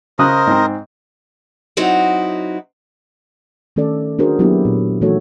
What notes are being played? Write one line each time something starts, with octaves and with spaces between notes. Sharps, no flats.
C#3 A#4 C5 D#5 D#6 F#6
G#2 C4
F#3 C4 D#4 E4 F#4
D#3 A3 C#4 A4 D5
D4 F#4 G#4 A#4 C5
F#3 A#3 B3 D4 E4 G4
A#2
E3 A3 D#4 F#4 A4 C#5